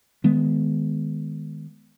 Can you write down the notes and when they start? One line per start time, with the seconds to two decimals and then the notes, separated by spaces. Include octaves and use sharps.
0.24 D#3 G#3 B3